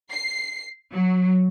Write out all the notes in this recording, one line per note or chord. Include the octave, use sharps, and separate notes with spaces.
C7
F#3